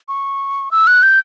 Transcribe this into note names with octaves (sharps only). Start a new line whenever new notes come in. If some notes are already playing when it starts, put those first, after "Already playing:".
C#6
E6
F#6
G6